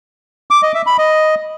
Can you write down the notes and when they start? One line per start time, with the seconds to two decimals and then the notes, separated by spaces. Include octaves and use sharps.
0.51 D6
0.63 D#5
0.74 E5
0.86 B5
0.98 D#5